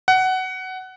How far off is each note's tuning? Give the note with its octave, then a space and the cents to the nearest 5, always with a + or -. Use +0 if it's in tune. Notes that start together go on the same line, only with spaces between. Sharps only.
F#5 +15